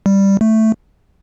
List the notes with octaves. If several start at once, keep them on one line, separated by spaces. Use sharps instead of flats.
G3
A3